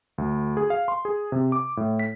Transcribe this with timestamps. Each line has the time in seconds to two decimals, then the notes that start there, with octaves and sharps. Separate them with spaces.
0.18 D2
0.57 G#4
0.70 F5
0.88 C6
1.05 G#4
1.32 C3
1.52 D6
1.77 A2
1.99 B6